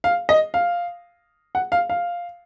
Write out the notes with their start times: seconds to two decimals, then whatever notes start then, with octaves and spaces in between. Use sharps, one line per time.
0.04 F5
0.29 D#5
0.54 F5
1.55 F#5
1.72 F5
1.89 F5